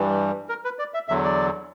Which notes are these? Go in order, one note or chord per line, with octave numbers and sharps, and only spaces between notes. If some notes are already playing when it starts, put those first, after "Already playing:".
Already playing: G2 E3 G3
A#4
B4
D5
E5
E2 D3 F#3 E5
D5